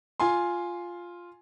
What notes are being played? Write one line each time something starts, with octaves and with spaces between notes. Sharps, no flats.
F4 G#5 C6